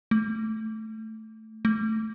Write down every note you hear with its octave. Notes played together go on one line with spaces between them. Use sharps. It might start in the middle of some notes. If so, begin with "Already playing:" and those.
A3
A3